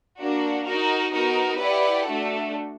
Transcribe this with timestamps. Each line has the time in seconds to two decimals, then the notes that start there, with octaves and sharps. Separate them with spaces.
0.21 A#3 D4 F#4
0.67 D#4 F#4 A#4
1.14 B3 D#4 F#4 A#4
1.60 E4 G4 B4 D5 F#5
2.06 A3 D4 F#4 A4